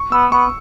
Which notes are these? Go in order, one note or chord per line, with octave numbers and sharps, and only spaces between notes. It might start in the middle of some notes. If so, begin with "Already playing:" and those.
Already playing: C#6
B3 E6
B3 C#6